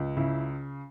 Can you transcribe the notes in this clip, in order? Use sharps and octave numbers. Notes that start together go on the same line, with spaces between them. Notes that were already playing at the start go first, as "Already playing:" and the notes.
Already playing: C#2
C#3 E4